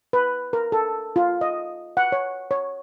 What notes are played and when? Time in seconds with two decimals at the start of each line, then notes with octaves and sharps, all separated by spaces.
0.13 B4
0.53 A#4
0.72 A4
1.16 F4
1.41 D#5
1.97 F#5
2.12 C#5
2.51 C#5